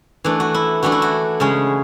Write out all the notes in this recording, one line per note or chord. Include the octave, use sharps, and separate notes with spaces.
E3 A3 D4
F#4
E4
E3 A3 D4 F#4
E4
F#4
C#3 G#3 C#4